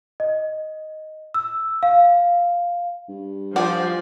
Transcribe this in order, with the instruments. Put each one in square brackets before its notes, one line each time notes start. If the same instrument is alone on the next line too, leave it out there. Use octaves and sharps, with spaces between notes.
[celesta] D#5
E6
F5
[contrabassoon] G2
[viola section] F3 [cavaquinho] D5 G#5 [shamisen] F#5